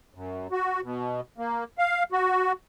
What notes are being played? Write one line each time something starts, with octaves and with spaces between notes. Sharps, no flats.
F#2
F#4
B2
A#3
F5
F#4